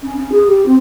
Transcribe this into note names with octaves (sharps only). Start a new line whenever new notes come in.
C#4
C#4
G#4
G4
C4